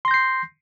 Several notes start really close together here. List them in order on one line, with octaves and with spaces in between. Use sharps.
C6 A#6 G6 C7